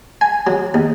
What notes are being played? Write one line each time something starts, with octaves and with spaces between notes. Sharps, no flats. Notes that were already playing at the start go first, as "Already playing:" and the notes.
G#5
F#3
D#2